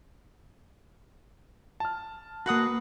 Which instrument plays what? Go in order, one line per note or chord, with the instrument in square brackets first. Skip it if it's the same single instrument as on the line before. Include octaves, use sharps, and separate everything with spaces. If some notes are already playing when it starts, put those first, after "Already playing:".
[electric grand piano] A5 F6
[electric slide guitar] A#3 F#4 [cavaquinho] B4 F#5 D#6